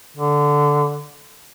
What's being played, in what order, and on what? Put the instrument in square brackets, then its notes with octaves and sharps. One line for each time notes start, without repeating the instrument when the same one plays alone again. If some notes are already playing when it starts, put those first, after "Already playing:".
[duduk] D3